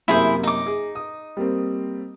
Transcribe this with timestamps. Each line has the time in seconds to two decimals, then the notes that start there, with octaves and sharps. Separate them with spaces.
0.08 F#2 C3 A#3 E4 G#4 C5
0.43 D#4 D6
0.66 G#4
0.95 D#6
1.37 G3 A#3 C4